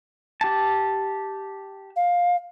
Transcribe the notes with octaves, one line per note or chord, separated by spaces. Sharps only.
G4 A5
F5